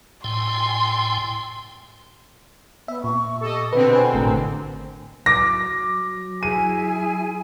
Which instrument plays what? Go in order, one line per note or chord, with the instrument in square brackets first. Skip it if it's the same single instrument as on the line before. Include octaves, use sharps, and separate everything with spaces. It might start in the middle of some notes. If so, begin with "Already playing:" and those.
[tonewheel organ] A2 G5 G#5 [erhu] C6
[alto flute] B3 [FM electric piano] E5
[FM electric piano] A#2 [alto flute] C#6
[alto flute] G4 [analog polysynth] A4 D#5
[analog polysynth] B2 D3 C4 [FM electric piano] B4
[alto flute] G#4 [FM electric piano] B4 F#5 G#5
[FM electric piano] G#1 A2 A#4 [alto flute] G#5
[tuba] F#3 [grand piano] D6 A#6
[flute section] E4 G#4 G#5 [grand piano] D#7